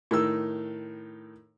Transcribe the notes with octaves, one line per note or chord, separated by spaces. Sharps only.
A2 D#3 E6